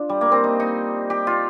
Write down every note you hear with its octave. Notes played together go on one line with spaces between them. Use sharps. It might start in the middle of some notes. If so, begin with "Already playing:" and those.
Already playing: D4 F4
G3
A#3
C4
D#4
D#4
G4
F4